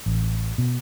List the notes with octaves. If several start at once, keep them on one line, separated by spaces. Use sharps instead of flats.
A1
B2